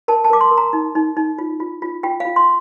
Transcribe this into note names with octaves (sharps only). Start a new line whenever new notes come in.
A#4 A5
A5
A#4 D6
C6
A#4
A#5
D#4
D#4
D#4
F4
F4
F4
F4 G5
F5
F4
C6